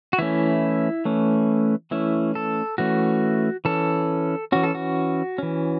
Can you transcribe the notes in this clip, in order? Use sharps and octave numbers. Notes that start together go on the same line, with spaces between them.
F#4
E3 A3 C#4 E4
E3 A3 C#4
E3 A3 C#4 E4
A4
E3 A3 C#4 F#4
E3 C#4 A4
E3 C#4 F#4
A4
F#4
E3 C#4